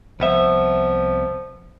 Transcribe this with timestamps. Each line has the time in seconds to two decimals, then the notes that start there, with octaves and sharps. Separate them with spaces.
0.20 C2 F3 B3 E5